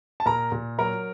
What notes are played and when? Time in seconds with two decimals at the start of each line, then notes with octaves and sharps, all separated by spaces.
0.20 A5
0.26 A#2 A#4 A#5
0.52 A#2
0.78 F#3 A#4 A#5